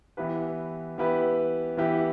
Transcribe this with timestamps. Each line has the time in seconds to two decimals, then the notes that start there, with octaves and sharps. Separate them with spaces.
0.17 E3 B3 E4 G4 B4
0.98 E3 B3 E4 G4 B4
1.77 E3 B3 E4 G4 B4